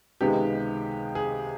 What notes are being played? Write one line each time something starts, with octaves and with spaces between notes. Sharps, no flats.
C#2 C3 D#3 G#3 B3 G4
G#4